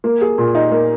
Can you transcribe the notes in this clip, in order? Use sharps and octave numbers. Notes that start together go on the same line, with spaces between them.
A#3
G#4
A#2
D#4
A#3